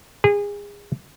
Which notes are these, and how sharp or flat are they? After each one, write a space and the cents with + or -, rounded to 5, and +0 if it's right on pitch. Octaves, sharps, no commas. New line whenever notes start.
G#4 -30